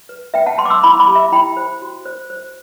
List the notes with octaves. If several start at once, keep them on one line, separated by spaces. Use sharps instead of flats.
B4
B4 E5 G5
F#5 A5
B4 A5 C6
D6
C6 E6
E4 B5 D6
B5 D6
G4
E5
E4 G5 B5
C5
F#4
C5
C5